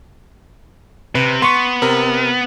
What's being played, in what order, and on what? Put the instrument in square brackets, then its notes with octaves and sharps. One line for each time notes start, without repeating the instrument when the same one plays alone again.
[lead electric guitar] C3 [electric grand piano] B4
[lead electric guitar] B3 [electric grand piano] C6 C#6
[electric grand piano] C3 A#4